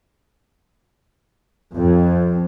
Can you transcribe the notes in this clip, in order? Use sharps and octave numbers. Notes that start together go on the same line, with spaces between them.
F2